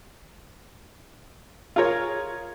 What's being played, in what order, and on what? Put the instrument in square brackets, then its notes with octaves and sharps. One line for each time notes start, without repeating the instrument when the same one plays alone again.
[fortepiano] F4 G#4 A#4 C#5